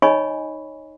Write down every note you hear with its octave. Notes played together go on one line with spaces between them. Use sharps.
D#4 C#5 D#5 G#5 B5 C#6